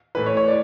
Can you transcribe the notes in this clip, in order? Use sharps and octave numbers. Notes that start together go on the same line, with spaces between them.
A2 E3 B4
C#5
C#5
D5